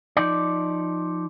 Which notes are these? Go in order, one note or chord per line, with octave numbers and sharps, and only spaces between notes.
F3 D#4 D5